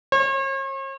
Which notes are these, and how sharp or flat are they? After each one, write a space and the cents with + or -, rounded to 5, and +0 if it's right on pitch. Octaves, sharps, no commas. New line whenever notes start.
C#5 -45